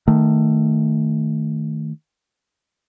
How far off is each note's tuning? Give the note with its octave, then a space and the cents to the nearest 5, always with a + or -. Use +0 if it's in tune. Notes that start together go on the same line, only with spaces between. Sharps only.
D#3 +0 A3 +10